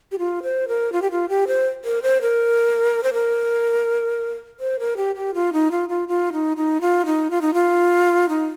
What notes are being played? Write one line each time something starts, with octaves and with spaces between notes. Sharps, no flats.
G4
F4
C5
A#4
F4
G4
F4
G4
C5
A#4
C5
A#4
C5
A#4
C5
A#4
G4
G4
F4
D#4
F4
F4
F4
D#4
D#4
F4
D#4
F4
D#4
F4
D#4